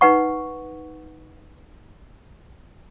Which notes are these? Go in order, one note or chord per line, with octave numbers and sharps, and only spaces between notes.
D#4 B4 F#5 C#6